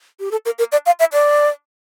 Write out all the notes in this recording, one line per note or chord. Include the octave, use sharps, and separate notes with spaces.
G4
A4
A#4
A#4
D5
F5
E5
D5